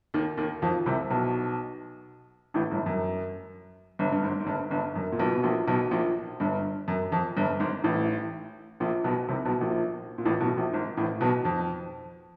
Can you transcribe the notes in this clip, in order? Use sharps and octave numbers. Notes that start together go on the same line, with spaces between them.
D#2 D#3
D#2 D#3
F2 F3
C2 C3
B1 B2
A1 A2
G1 G2
F#2
G1 G2
G2
G#1 G#2
G#2
G1 G2
G1 G2
F#2
A#2
B1 B2
B2
A#1 A#2
B1 B2
A#1 A#2
G1 G2
F#2
F2
G1 G2
G#1 G#2
A1 A2
A#1 A#2
B1 B2
C2 C3
B1 B2
A#1 A#2
A#2
A1 A2
B1 B2
A#1 A#2
G#1 G#2
A1 A2
B1 B2
F2